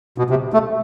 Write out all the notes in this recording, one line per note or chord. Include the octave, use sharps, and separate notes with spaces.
B2
C3
A3